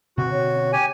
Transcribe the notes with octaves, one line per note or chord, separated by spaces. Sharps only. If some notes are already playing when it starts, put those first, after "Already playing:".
B2 D3 C4 F#4
C#5
G4 G#5